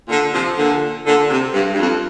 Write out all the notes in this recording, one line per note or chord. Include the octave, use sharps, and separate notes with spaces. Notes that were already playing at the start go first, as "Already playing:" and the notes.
A#2 D3
C3 F3
A#2 D3
A#2 D3
C3
G2
G2
F2